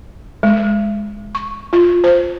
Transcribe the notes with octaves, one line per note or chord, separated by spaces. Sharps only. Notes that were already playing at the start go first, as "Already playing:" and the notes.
G#3
C#6
F4
C5